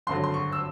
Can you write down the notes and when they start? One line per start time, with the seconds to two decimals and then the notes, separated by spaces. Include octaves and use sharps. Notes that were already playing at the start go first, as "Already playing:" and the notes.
0.07 G#1 G2 D3 F#3 C6
0.24 C6
0.34 C#6
0.52 E6